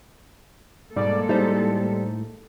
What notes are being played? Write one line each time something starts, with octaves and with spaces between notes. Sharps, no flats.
G#2 B2 G3 G#3 A#3 A4 D5
A2 G3 D#4 C5